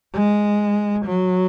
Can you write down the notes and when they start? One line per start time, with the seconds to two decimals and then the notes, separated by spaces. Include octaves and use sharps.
0.13 G#3
1.05 F#3